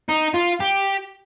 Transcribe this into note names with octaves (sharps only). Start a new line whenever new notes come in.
D#4
F4
G4